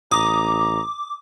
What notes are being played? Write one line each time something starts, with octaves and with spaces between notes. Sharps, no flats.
A1 A#5 D6 D#6